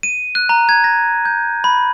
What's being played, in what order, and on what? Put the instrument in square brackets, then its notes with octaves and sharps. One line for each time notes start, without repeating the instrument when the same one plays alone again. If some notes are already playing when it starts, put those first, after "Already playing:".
[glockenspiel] D#7
F#6
A#5
G#6
A#6
G6
B5